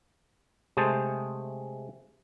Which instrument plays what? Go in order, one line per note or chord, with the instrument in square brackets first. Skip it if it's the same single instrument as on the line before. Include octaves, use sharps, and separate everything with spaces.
[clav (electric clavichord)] C3 G#3 A3 G#4 C5 A5